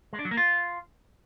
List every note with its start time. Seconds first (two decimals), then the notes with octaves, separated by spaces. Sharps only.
0.13 G#3
0.19 D4
0.25 F#3
0.31 A#3
0.37 F4